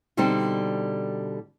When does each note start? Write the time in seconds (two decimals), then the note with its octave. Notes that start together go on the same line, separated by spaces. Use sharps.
0.17 B2 D3 G3 C4 D4 D#4